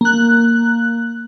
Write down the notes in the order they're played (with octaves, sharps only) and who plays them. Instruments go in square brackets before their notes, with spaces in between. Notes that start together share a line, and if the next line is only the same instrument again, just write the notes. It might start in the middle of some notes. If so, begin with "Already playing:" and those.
[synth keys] A#3 F#6